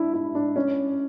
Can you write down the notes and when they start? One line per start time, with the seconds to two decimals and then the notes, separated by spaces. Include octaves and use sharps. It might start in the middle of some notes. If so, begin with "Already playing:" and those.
Already playing: D4 E4
0.14 E4
0.35 D4
0.56 C#4